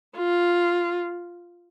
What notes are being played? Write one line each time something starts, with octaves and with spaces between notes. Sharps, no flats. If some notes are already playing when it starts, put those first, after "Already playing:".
F4